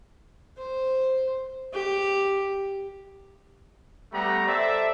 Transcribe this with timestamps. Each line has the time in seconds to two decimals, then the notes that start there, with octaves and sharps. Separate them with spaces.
0.58 C5
1.74 G4
4.12 G3 A3 B3 G4 A#5
4.47 A4 C5 D5 E5